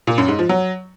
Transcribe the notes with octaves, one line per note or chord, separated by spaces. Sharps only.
A#2
F#2
G#2
F3
F#3